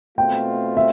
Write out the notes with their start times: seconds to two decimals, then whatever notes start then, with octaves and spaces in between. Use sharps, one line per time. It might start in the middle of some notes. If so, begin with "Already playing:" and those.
0.17 B2 A3 C4 F4 G5
0.77 E5